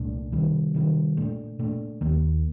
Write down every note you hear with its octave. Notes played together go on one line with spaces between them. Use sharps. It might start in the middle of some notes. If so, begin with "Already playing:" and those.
Already playing: C2 A#2 A3 D4
C3 D#3 G3
C3 D#3 G3
A#2 A3 D4
A#2 A3 D4
D#2 D#3 A#3